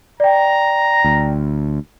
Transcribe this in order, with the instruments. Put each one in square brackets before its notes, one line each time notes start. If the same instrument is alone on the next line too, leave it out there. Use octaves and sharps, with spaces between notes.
[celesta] D5 G5 [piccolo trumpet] A#5
[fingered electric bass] D2